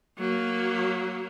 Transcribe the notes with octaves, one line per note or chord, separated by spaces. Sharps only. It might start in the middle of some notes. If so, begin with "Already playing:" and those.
F#3 A#3